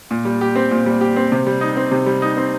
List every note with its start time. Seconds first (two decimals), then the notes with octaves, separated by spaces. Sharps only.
0.11 A#2
0.25 G3
0.41 G4
0.56 C4
0.71 A#2
0.86 G3
1.01 G4
1.16 C4
1.32 C3
1.47 G3
1.61 D#4
1.76 C4
1.91 C3
2.06 G3
2.22 D#4
2.37 C4